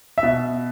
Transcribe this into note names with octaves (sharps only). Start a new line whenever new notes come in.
E5
B2